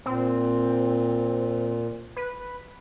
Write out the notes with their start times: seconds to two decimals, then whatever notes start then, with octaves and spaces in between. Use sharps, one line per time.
0.06 A#2 C4
2.16 B4